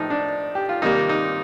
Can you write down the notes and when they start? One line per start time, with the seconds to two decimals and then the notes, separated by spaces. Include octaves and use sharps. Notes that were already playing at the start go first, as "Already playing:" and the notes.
Already playing: A2 F3 A3 D#4 G4
0.10 D4
0.55 G4
0.69 F4
0.82 C3 D#3 G3 A#3 D#4
1.09 D#4